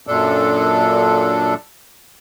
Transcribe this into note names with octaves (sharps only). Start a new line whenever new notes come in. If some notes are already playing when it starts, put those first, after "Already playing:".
F#2 A#2 D4 A4